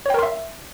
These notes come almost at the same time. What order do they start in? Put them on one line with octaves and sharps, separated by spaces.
C#5 G5 A#4 C6 E5